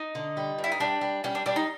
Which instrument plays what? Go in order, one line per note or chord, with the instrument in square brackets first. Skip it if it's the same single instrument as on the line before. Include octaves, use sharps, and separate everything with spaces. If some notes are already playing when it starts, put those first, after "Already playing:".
Already playing: [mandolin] D#4
[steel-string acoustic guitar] D3
G3
G2
[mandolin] E4
D#4
[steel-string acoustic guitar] G3 [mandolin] D4
[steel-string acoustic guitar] G3
[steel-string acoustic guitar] G3 [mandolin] C#4
[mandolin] D4
[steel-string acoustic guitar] G3 [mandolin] D4
[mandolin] D#4